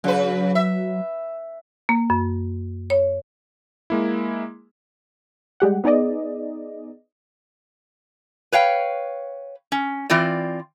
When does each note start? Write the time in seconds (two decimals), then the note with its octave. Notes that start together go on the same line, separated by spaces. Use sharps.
0.04 C#3 F#3 B4
0.55 E5
1.89 A#3
2.10 F#2
2.90 C#5
3.90 G#3 A#3 E4
5.60 G3 G#3 G4 F#5
5.84 B3 D#4 G#4 D5 D#5
8.52 B4 C#5 F5 G5
9.72 C#4
10.10 E3 C4 F4 D5